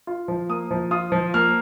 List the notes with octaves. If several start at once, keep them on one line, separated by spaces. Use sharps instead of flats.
F4
F3
A#3 D#6
F3
F4 D#6
F3
A#3 F6